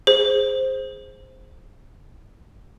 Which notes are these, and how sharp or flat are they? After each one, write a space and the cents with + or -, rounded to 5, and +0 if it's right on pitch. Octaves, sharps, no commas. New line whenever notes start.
G#4 +0 C5 +0